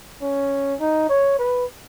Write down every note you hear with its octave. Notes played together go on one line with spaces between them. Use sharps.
C#4
D#4
C#5
B4